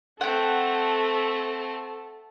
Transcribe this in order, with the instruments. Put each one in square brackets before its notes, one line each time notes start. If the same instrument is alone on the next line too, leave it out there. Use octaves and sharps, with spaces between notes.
[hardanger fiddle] A3 C4 [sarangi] A4 [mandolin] F#5 G5